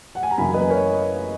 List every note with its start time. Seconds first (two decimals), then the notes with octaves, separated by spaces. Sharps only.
0.15 F#5
0.23 G#5
0.31 A#5
0.38 F#2 C#3 E3 A#3 E4 G#5 B5
0.54 B4 D#5
0.70 A#4 C#5